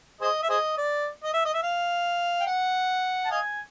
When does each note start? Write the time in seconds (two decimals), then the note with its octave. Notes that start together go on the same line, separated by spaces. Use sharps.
0.21 G#4 C5 D#5
0.43 E5
0.50 G#4 C5 D#5
0.78 D5
1.24 D#5
1.33 E5
1.45 D#5
1.54 E5
1.63 F5
2.40 G5
2.47 F#5
3.25 A5
3.31 D#5 F5 G#5